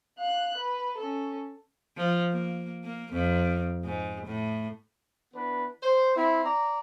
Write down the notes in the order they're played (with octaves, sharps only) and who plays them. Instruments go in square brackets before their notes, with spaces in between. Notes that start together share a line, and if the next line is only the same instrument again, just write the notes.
[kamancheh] F5 F#6
B4
C#4 A4
[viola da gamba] F3
A#3
A#3
F2
G#2
A2
[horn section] E3 B3 D4 B4
C5
C4 E4
D5 A#5